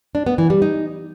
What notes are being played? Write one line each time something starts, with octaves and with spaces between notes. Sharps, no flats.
D4
B3
E3
G3
D#4